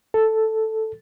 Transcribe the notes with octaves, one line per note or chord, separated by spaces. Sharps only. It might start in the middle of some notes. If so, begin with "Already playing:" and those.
A4